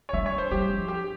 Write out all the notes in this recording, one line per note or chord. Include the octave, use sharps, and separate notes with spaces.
C#5
G#3 E5
C#5
C5
G3 G4
F3
G4